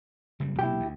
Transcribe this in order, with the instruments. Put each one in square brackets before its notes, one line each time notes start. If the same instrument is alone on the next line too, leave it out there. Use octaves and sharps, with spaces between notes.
[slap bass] F#1 C#3 G3
[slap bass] B1 C3 A#3 [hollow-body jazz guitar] E4 G4
[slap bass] D2